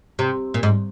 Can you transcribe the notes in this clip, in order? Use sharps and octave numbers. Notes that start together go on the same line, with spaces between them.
C3
A#2
G#2